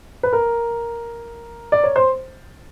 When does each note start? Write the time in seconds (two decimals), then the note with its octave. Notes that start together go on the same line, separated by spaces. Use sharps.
0.23 B4
0.33 A#4
1.72 D5
1.84 C#5
1.96 C5